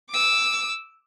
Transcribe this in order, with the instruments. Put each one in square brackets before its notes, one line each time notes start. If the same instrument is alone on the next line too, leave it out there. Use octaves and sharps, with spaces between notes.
[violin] D6 E6